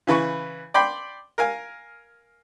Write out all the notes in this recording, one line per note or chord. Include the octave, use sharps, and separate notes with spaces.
C#3 E3 B4 C#6
D5 G5 B5 C6
A#4 F5 G#5